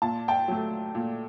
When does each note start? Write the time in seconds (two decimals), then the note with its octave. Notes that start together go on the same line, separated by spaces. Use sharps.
0.02 A#2 A5
0.28 G5 A5
0.48 F#3 A3
0.95 A#2